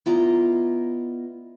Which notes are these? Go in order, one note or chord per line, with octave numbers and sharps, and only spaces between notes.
B3 E4 F4 D5 D#5 A#5